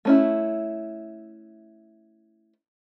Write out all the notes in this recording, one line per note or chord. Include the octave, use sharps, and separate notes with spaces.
A3 C#4 E4